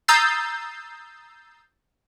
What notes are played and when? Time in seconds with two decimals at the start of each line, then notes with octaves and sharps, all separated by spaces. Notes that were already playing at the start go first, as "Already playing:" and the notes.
0.08 A#5 D#6 E6 G6 A6 C7